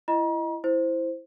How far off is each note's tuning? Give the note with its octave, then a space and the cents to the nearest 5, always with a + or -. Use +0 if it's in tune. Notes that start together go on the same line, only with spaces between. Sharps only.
E4 +25 D#5 +0 A#5 +40
E4 +0 C5 +0